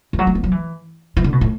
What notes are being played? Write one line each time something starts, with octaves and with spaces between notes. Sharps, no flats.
E3
F#3
A3
B3
F#3
E3
E3
D3
B2
A2